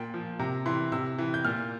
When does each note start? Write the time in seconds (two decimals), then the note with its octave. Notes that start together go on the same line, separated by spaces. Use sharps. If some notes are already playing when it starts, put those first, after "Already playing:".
Already playing: A#2 G5
0.14 F3
0.39 C3 A#5
0.66 E3 C6
0.92 C3 E6
1.18 E3
1.34 G6
1.45 A#2 F6